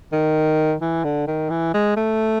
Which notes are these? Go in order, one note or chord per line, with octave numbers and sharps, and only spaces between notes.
D#3
E3
D3
D#3
E3
G#3
A3